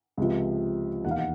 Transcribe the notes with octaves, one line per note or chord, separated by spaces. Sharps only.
C#2 C3 F3
E1 D#2 D#3 F#5
F5
F#5